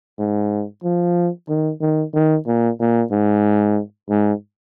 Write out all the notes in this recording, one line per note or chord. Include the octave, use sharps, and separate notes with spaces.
G#2
F3
D#3
D#3
D#3
A#2
A#2
G#2
G#2